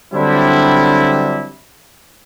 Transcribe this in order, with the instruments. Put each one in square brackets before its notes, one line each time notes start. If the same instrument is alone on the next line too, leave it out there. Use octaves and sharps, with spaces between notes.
[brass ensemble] D3 F#3 G3 C4 D4 E4